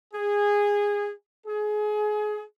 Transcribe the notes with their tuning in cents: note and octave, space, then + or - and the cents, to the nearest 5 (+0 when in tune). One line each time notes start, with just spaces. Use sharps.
G#4 -15
G#4 +25